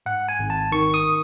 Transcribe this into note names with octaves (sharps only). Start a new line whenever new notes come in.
G#2 F#5
G#5
G#1
A5
D#3 C#6
D#6